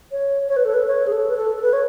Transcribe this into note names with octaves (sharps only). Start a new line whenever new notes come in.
C#5
C#5
B4
A4
B4
C#5
G#4
A4
B4
A4
A4
B4
C#5